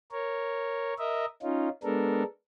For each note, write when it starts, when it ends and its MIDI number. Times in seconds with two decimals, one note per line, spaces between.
0.11 0.94 70
0.11 0.94 73
0.99 1.26 70
0.99 1.26 75
0.99 1.26 76
1.43 1.69 61
1.43 1.69 63
1.43 1.69 65
1.83 2.23 56
1.83 2.23 59
1.83 2.23 62
1.83 2.23 69
1.83 2.23 70